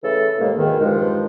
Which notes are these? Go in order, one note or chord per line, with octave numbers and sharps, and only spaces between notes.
C#3 E3 A3 A4
A2 C3 D#3 G#3 A#3
E2 G#2 B2 D#3
G2 D#3 F3 G#3